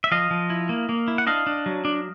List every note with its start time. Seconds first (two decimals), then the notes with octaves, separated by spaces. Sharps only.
0.04 E5
0.11 F3 D#5 F5
0.31 F3
0.50 E4
0.69 A#3
0.89 A#3
1.08 E4
1.18 F#5
1.27 D4 D#5 F5
1.47 D4
1.66 F#3
1.85 D4